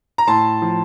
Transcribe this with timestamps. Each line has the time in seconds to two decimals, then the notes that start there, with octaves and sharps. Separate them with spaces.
0.18 A#5
0.27 A2 A5 C6
0.62 F3